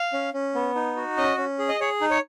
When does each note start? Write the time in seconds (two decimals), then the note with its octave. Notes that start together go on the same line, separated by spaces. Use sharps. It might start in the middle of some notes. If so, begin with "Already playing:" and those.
Already playing: F5
0.13 C#4
0.34 C#4
0.55 B3
0.75 D#4
0.97 F#4
1.17 C#4 D#5
1.38 C#4
1.59 G#4
1.69 D#5
1.80 G#4 C#5
2.01 D#4
2.10 C#5